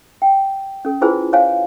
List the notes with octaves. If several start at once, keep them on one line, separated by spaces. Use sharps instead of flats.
G5
C#4 A4
E4 F4 G#4 B4 C5 G#5
C5 C#5 F5 G#5